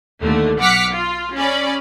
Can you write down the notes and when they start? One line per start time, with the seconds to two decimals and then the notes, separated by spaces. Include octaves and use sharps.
0.22 D#2 D3 A3
0.59 B1 F#5 D6 F6 B6 C#7
0.92 F4
1.35 C#4 G#4 D5 B5